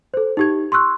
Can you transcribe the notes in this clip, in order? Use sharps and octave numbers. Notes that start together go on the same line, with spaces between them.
A4 C5
D#4 G4 G#6
C6 C#6 E6 F#6